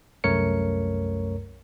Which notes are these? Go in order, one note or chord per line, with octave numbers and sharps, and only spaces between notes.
C2 F#2 A3 A#4 C#5 C#7